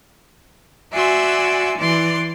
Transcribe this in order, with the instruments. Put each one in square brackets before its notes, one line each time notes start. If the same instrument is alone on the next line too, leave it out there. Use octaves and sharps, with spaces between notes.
[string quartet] F#4 D5 E5 G#5 C6 E6
E3 D5 C6